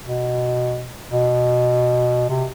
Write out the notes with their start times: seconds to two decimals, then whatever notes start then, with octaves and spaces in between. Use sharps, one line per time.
0.05 B2
1.11 B2
2.29 C3